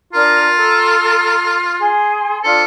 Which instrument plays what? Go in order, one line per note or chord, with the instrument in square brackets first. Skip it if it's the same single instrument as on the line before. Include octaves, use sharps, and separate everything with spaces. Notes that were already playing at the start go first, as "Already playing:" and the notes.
[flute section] D4 A#4 A#5 [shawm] F4
[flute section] A4 A#5
G#4 C6
[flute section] D4 F4 C5 [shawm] A4